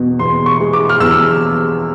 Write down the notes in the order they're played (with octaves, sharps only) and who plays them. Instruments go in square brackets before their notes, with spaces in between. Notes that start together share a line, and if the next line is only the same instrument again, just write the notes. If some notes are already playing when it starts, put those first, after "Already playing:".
Already playing: [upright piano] E2 B2
E2 C6
C#6
G#3
D6
F6
E2 E6